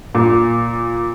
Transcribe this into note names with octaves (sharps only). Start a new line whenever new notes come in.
A#2